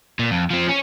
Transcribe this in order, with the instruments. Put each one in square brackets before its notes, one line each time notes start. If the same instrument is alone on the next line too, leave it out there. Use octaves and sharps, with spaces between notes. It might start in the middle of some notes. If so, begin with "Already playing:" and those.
[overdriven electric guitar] A#2
F2
F3 C4
C#4